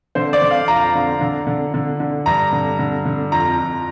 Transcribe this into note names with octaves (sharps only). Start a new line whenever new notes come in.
D3 C5
D5
D3
F5
F2 A#5
D3
D3
D3
D3
D3
G2 A#5
D3
D3
D3
F2 A#5
F2